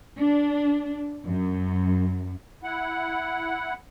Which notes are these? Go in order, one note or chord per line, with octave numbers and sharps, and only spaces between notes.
D4
F#2
E4 F#5